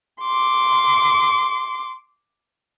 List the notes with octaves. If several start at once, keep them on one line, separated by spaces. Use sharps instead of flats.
C6 D6